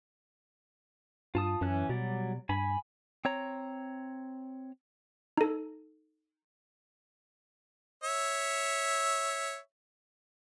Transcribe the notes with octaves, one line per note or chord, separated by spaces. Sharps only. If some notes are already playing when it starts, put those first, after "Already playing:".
G2 F4 A5 D#6
F#2 E3 C#4 F#6
B2 F#3 G3 D5
G2 G#5 B5
C4 C#5 A#5
D#4 A4
C#5 E5